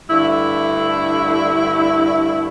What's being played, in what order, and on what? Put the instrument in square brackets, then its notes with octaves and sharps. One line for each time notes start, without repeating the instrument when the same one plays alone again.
[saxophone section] G2 D3 A3 E4